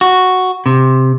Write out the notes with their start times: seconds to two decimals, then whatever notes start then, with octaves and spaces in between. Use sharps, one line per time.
0.01 F#4
0.66 C3